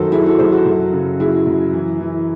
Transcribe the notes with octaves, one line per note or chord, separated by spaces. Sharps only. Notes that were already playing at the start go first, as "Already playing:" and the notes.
Already playing: F#2 D#3 F#4 A4 C5
F#3 E4 G#4
F#4 A4
F#2 G#4 C5
F#4 A4
F#2
C#3
F#3 E4 G#4
F#2
E3
E3